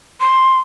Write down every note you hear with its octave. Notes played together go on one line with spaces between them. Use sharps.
C6